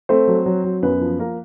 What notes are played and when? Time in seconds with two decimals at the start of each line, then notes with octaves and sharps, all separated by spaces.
0.09 A3 C4 C5
0.27 F#3
0.46 F#3
0.64 F#3
0.83 F#2 B3 B4
1.01 F3
1.20 A#3 A#4